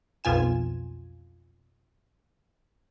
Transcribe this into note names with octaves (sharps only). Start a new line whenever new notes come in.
B1 F2 B2 F4 G#5 E7